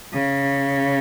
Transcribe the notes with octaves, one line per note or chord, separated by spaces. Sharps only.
C#3